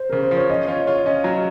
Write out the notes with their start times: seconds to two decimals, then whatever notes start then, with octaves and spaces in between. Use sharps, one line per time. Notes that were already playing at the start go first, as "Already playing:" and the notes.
Already playing: C5
0.10 C#3 A#4
0.23 C5
0.31 F3
0.37 C#5
0.50 C#4 D#5
0.68 F4 C#5
0.87 F4 C#5
1.06 C#4 D#5
1.24 F#3